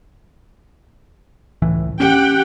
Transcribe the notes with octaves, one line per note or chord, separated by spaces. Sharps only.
C#2 A2 E3
C#4 G4 F#5 G5